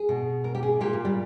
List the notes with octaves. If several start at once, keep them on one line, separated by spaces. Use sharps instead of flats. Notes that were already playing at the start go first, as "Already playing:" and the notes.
Already playing: G#4
B2
A#4
G4
G#4
A#2 G4
A#3
G3